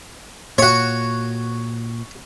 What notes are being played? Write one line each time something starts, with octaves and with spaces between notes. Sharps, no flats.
A#2 F#4 C#5